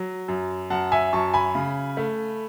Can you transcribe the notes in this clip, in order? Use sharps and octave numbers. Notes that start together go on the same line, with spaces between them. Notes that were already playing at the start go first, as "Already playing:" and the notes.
Already playing: F#3
F#2
F#2 F#5 A5
E5 G#5
F#2 A5 C#6
G#5 B5
C#3
A3